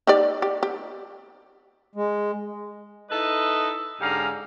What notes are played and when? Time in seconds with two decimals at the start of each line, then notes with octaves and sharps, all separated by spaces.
0.07 D#4 G4 D5
0.42 G4
0.63 G4
1.95 G#3
3.10 D#4 E4 A4 B4 D#5
4.00 G#2 D3 C#4 G4 F5 A#5